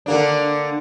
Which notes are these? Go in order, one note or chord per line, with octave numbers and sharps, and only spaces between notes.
D3 A#3 D4